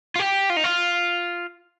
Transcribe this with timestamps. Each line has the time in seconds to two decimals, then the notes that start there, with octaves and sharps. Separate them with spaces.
0.16 F4
0.19 G4
0.50 F4
0.57 D#4
0.64 F4